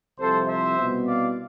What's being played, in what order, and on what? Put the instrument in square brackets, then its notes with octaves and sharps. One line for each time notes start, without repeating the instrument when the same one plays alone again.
[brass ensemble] C2 C3 F3 A4 C5
C5 E5
C2 B2 B3
D5 F5